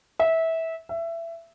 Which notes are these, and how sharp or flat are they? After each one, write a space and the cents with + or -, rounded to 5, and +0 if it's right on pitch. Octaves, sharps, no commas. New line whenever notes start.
E5 -20
E5 +20